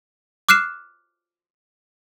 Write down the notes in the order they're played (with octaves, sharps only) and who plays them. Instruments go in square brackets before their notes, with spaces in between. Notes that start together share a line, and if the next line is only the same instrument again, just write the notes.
[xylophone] D6 F6 F#6 C7 E7